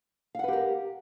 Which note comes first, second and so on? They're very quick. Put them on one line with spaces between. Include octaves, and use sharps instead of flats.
F5 F#5 B4 G4 A#4